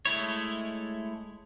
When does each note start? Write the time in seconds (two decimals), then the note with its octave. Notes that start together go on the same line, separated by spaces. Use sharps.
0.05 G#3 A3 E4 C#5